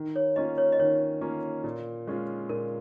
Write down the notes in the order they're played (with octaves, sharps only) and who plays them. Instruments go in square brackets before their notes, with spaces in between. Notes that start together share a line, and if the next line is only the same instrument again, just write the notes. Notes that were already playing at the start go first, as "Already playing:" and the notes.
Already playing: [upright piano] D#3
[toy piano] C#5
[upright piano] A#3 C#4 F4 [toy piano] D#5
[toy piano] C#5
D#5
[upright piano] D#3 [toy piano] C#5
[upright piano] A#3 C#4 F4
A#2
G#3 C#4 F4
[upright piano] A#2 [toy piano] A#4